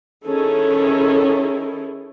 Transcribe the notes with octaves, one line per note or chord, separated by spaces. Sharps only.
D#3 C#4 E4 G#4 A4